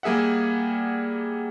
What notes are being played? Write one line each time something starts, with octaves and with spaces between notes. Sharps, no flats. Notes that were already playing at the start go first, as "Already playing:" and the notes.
G3 A#3 G#4 E5 F#5